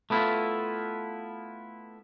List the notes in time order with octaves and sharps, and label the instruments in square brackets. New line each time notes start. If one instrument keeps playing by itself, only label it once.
[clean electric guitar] A3 B3 E4 F4